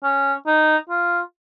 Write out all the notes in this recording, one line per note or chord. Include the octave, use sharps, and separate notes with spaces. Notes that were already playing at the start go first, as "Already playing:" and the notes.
C#4
D#4
F4